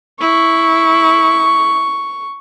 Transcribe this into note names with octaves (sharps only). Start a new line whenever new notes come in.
E4 C#6